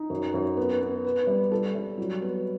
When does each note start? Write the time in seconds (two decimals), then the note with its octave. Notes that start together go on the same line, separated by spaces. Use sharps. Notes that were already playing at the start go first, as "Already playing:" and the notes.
Already playing: D#4
0.10 F#2
0.34 F#2
0.57 B3
0.81 B3
1.04 B4
1.27 G3
1.51 A4
1.75 G3
1.98 F#3
2.22 B3